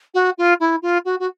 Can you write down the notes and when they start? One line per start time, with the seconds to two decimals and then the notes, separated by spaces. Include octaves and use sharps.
0.14 F#4
0.38 F4
0.60 E4
0.82 F4
1.05 F#4
1.19 F#4